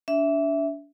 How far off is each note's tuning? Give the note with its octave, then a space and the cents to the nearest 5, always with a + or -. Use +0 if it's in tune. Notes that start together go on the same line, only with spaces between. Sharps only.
D4 -30 E5 +0